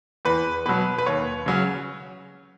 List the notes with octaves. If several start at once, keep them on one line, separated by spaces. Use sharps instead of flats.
E2 B4
B2 F#3 B4
B4
D#2 C#5
C#3 F#3 C#4